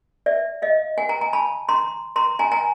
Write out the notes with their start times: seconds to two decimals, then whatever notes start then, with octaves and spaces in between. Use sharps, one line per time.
0.26 D5 E5
0.62 D#5 F5
0.98 F#5 G#5
1.09 G#5 A#5
1.21 G#5 A#5
1.33 A5 B5
1.69 A#5 C6
2.16 A#5 C6
2.39 G#5 A#5
2.52 G#5 A#5